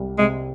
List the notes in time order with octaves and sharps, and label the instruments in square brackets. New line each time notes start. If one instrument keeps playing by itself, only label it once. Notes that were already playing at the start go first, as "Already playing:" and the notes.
Already playing: [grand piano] C2 G3
[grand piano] C3 [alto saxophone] G#3